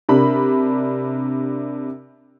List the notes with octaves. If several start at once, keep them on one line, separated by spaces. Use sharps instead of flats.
C3 D4 A#4 B5